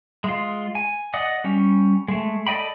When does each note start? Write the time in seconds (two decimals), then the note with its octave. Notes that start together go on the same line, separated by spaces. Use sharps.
0.24 G#3 F4
0.75 G#5
1.14 D5 D#5 F#5 D#6
1.44 G3 C#4
2.08 G#3 A3
2.47 A4 D5 D#5 G5 B5